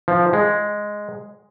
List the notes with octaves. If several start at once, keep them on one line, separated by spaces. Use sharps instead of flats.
F3
G#3